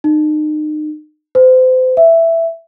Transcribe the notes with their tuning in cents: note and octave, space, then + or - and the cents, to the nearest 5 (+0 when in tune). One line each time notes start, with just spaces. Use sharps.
D#4 -35
C5 -35
E5 +5